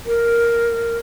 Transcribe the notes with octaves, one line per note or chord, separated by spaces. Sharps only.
A#4